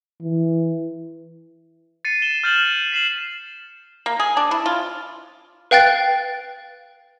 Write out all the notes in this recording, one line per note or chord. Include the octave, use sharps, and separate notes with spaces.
E3
A6 C7 C#7 D#7
E7 G7
F6 G6 A6 E7 F#7
B6 C7 E7 F#7
A#3
G#4
D4
E4
F4
B4 F5 G5 F#6 A6